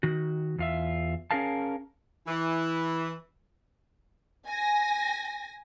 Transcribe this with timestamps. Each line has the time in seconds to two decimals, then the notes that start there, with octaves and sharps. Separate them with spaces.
0.03 D#3 F#4
0.58 E2 F4 E5
1.31 C#4 F#4 G#4 A#4 F5 A5
2.28 E3
4.47 G#5 A#6